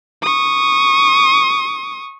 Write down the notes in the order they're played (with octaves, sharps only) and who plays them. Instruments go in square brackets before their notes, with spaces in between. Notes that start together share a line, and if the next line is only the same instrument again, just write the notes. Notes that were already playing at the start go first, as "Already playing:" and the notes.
[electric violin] C#6 D#6